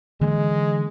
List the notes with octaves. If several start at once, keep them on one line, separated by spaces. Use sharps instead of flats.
D3 E3 G#3 A#3